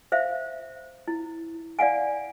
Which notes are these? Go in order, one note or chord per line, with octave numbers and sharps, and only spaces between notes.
C5 E5 F5
E4
D5 F5 F#5 G#5